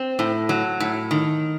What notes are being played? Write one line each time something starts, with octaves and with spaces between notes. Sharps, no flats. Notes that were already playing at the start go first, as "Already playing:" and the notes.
Already playing: C4
A2
F#3
A2
D#3